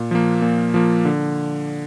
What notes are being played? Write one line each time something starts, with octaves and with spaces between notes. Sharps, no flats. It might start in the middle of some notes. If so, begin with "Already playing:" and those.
Already playing: A#2
F3 A#3
A#2
F3 A#3
D3